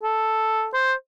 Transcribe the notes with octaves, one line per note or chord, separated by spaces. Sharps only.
A4
C5